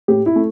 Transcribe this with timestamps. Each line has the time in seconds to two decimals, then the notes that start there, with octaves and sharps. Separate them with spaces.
0.08 A2 G4
0.26 E4
0.36 A3